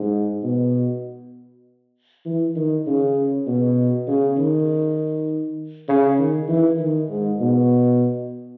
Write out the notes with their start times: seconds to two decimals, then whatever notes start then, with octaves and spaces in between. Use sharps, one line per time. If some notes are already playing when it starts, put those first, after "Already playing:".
Already playing: G#2
0.43 B2
2.25 E3
2.55 D#3
2.86 C#3
3.47 B2
4.07 C#3
4.38 D#3
5.88 C#3
6.18 D#3
6.48 E3
6.79 D#3
7.09 G#2
7.40 B2